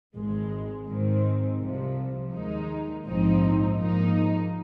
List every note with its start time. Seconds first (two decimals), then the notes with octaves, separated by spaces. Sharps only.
0.16 G#1 G#2 G#3
0.87 G#2 D#3 C4
1.60 C2 C3 F3
2.32 D#2 D#3 G#3 D#4
3.05 A#1 G#2 F3 C4 D#4
3.77 G#2 F3 A#3 D#4